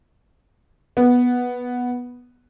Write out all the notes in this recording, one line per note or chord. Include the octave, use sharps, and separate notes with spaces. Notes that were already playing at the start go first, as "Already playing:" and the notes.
B3